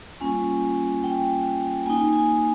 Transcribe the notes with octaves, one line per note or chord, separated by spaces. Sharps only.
G3 A#3 C#4 F4 G#5
G5
A#3 D#4 G#5
G#5